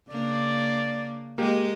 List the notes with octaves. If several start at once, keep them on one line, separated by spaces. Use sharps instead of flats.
C#3 A#3 D4 D5
G#3 A#3 G4 D#5